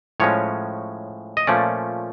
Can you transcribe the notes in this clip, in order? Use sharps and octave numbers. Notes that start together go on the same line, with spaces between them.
A2 F3 G#3 C#4 C#5
D#5
A#2 F3 A3 C#4 D5